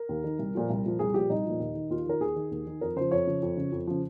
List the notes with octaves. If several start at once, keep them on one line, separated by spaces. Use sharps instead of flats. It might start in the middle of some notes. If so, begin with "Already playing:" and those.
Already playing: A#4
D#2
D#3
C2
A#2 F3
C2
A#2 F3
C2 G#4
A#2 F3 G4
C2 D#4
A#2 F3
D#2
D#3
D#2 F4
D#3 A#4
D#2 G#4
D#3
D#2
D#3
F2 A#4
C#3 F3 C5
F2 C#5
C#3 F3
F2
C#3 F3
F2
C#3 F3